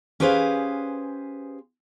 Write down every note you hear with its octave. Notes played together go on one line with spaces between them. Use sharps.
C#4 G4 G#4 B4 C5 F5